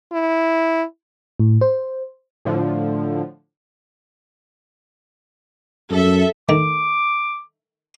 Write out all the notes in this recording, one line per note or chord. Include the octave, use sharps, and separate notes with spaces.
E4
A2
C5
A2 D3 F3
F#2 A4 E5
D#3 A3 D6